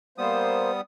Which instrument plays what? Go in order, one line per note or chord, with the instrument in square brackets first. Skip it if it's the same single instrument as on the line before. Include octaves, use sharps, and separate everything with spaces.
[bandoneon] G3 B3 D#6 [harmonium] A#3 C5